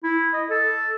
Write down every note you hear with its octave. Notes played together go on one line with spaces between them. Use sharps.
E4
D#5
A4